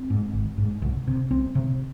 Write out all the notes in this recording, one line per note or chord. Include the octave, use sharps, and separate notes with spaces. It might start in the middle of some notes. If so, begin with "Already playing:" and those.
Already playing: C4
G#2
G#1
G#2
C2
C3
C2 C4
C3